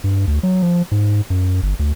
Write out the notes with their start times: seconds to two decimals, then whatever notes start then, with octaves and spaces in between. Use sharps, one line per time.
0.04 G2
0.27 D2
0.43 F#3
0.62 F3
0.92 G#2
1.30 F#2
1.63 G1
1.79 D2